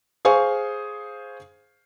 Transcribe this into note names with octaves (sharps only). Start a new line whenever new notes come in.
G#4 C5 F5 G#5 C#6